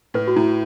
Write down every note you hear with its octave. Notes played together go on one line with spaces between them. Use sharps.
A2 B4
F#4
A2 E4